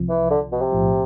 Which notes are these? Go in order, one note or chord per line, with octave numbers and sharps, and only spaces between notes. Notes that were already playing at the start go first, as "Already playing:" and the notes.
Already playing: C2 C3 F3
E3
D3
B2
C3
B1 A2 F3